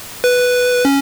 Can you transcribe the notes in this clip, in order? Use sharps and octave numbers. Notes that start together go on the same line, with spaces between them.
B4
C#4